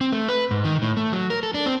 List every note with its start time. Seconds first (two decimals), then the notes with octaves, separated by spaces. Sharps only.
0.01 C4
0.12 A3
0.29 B4
0.51 G#2
0.64 D#3
0.82 A2
0.97 A3
1.12 F#3
1.30 A#4
1.43 A4
1.54 D4
1.66 C4